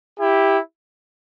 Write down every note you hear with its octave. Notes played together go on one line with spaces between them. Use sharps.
E4 G4